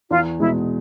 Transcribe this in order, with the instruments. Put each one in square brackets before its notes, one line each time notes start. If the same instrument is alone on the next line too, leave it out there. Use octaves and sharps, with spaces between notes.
[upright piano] E2 [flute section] F4
[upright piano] B2 G#3 [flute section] E4